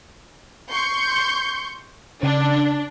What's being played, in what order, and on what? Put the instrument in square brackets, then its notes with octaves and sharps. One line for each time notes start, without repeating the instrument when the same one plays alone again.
[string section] C6 C#6 G6
[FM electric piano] C#3 [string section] D4